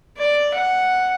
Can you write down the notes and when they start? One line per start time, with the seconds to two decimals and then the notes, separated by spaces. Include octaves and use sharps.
0.17 D5
0.54 F#5